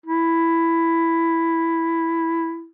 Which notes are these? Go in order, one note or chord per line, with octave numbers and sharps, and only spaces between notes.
E4